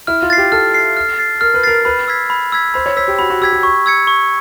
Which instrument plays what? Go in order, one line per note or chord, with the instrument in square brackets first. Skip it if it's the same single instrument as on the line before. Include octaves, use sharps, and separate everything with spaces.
[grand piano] E4 [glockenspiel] F6
[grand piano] F4
[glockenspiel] A6 C7
[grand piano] G4
[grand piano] A4 [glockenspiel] F6
[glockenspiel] A6 C7
F6
A6 C7
[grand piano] A#4 [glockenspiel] F6
[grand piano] B4
[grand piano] A#4 [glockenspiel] A6 C7
[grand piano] B4 [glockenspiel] B5
[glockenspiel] E6 G#6 B6
B5
E6 G#6 B6
[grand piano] C5 [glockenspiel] B5
[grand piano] C#5
[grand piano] C5 [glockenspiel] E6 G#6 B6
[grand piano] G4
[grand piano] F#4 [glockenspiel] B5
[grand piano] F#4
[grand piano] G4 [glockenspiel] E6 G#6 B6
[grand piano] G4
[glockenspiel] C#6
E6 G#6 C#7
C#6